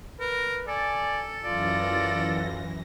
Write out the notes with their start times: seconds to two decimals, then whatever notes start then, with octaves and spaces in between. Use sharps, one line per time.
0.20 A#4 B4
0.68 A4 D5 G#5
1.45 F#2 E3 F4 D5 A#6